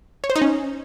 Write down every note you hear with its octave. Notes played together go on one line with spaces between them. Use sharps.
C#5
C5
D#4
C#4